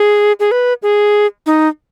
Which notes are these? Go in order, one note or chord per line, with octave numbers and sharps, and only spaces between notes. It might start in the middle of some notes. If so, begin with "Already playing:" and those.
Already playing: G#4
G#4
B4
G#4
D#4